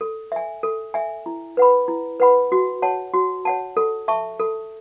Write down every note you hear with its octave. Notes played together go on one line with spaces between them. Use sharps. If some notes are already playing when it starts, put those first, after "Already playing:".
A4
E5 G#5
A4
E5 G#5
E4
B4 F#5 B5
E4
B4 F#5 B5
F#4
C#5 F#5 A5
F#4
C#5 F#5 A5
A4
E5 A5 C#6
A4